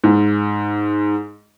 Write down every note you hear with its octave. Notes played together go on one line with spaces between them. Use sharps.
G#2